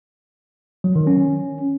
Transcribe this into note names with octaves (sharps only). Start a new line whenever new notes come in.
F#3
D#3
C#4